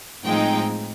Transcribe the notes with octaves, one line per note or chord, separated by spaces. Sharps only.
A2 F3 G#3 C4 D#4 G5